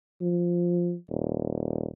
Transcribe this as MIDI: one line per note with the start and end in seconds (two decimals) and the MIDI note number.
0.21 0.94 53
1.09 1.87 27